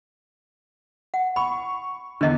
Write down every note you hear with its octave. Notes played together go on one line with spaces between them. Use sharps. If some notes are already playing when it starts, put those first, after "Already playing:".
F#5
B5 C#6
E2 D3 D4 D#5